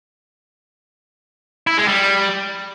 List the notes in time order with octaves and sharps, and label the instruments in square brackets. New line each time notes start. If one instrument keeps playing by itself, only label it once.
[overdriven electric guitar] E4
G#3
G3